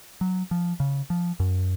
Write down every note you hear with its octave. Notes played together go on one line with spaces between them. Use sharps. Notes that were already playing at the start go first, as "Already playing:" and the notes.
F#3
F3
C#3
F3
F#2